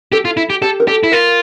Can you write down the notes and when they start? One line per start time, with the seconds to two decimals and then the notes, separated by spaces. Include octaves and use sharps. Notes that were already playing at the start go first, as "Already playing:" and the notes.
0.12 G4 A4
0.25 F4
0.37 E4
0.50 G4
0.62 G4 A4
0.80 A#4
0.87 G4 A4
1.03 E4
1.12 F4 A#4